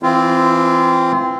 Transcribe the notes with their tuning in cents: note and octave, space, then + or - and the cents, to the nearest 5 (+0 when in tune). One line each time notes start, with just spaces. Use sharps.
E3 +0 C4 +0 F4 -25